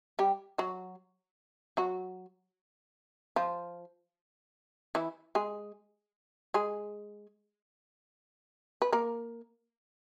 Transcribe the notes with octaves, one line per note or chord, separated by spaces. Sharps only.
G3 G4
F#3 F#4
F#3 F#4
F3 F4
E3 E4
G#3 G#4
G#3 G#4
B4
A#3 A#4